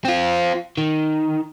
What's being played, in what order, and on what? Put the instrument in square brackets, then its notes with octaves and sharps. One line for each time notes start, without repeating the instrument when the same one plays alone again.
[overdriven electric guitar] C4 F4
D#3